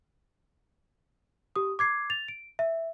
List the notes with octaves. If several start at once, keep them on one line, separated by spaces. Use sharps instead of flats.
G4 D#6
D6 G#6 C7
A6 F7
D7
E5